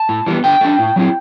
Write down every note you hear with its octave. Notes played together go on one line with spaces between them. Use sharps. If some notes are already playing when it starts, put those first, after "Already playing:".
Already playing: A5
A2
E3 G3 B3
D3 G5
A3 D4
A2
F#3 C4 E4